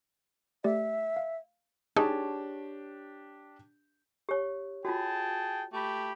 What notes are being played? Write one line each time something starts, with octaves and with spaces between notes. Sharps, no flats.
A3 G4 D5 E5
F5
D4 D#4 G4 G#4 C#5 A5
G4 C#5
F4 F#4 G#4 G5 A5
A3 G4 B5